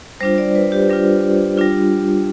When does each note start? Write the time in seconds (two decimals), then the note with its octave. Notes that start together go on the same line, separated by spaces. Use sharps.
0.20 G3 D4 F4 C5
0.38 D5
0.55 B4
0.72 G4
0.89 G3 D4 F4
1.57 G3 D4 F4